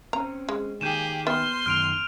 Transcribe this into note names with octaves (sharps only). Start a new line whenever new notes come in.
C4 C#4 A#5
G#3
D#3 A#3 G4 G#4 G6 D#7 E7
B3 E5 C6 F6
F#2 D#3 F6 D7 F7